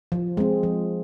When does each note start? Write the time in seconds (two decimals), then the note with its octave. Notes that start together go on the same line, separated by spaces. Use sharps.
0.12 F3
0.37 G#3 C4
0.63 F3